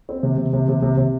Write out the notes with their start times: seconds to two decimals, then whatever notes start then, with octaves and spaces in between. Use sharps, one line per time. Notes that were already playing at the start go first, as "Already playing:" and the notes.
0.09 C4
0.23 C3
0.38 C3
0.53 C3
0.69 C3
0.82 C3
0.97 C3